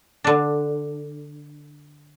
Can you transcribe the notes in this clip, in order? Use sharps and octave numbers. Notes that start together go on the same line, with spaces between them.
D3 D4